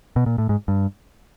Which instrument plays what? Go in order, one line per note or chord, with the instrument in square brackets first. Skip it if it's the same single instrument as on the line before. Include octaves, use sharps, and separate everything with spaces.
[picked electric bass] B2
A#2
A2
G#2
G2